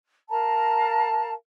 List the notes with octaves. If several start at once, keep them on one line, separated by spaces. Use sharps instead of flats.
A#4 F5 A5 A#5